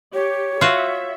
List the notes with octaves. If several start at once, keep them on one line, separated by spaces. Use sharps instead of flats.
G4 C#5
F4 F#4 E5